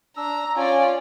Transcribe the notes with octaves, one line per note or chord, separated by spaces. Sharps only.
D4 A#5 E6
C#4 F4 D5 G#5